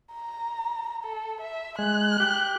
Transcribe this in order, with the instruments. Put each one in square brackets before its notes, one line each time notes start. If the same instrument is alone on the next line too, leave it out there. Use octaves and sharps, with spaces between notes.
[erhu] A#5
A4
E5
[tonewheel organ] G#3 [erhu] F#6
[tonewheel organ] G4